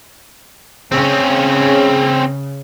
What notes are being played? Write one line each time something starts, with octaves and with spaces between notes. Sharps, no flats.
C#3 C4 C#4